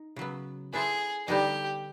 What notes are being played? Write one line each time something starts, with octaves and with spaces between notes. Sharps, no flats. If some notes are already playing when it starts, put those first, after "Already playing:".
Already playing: D#4
C#3 F#3 B3
B3 E4 G#4 A4 C5
D3 G3 B3 D#4 G4